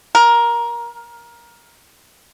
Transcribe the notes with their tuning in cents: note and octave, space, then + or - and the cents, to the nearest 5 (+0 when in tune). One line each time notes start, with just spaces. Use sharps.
A#4 +15